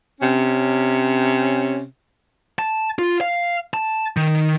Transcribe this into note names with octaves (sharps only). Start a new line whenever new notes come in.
C3 C#4
A5
F4
F5
A5
D#3